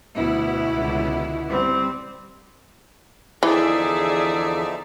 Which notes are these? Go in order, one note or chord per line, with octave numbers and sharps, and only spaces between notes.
D2 B2 B3 E4
C#2 D3
G3 C4
E2 D3 E3 F3 D#4 G#4 D5 E5